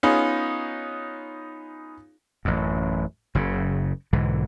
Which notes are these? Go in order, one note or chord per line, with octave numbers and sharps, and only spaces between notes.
B3 C#4 D#4 F4 G#4
A1 F#2
F#1 C#3
B1 G#2 D3 E3